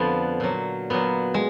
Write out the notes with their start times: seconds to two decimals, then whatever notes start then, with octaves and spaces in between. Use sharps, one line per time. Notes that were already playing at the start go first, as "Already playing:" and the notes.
Already playing: F2 D3 F3 B3
0.40 A#2 F#3
0.90 A#2 F#3 B3
1.34 G#3